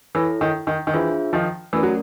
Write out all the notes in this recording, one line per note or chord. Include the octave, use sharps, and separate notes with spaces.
E3 E4 A4 C#5
D#3
D#3
D#3
E3 D4 F4 G#4 C5 E5
D#3 F3
E3 A3 C#4 F#4 A#4 D5
F#3